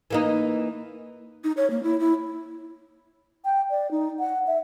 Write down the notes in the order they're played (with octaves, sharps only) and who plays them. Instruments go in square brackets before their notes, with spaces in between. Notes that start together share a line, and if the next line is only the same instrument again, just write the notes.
[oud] E3 A#3 D#4
[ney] D#4
C#5
A#3
E4
E4
[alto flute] G5
D5
D#4
F#5
E5